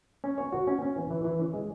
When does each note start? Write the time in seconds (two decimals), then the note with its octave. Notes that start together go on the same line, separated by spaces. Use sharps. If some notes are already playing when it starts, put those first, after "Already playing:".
0.24 C#4
0.38 C#5
0.52 F#4
0.67 C#4
0.82 C#4
0.96 E3
1.11 E3
1.24 E3
1.39 C#4
1.54 G#3